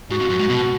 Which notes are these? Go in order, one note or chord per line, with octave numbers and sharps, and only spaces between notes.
G#2 F#4
F2
F#2
G#2
B2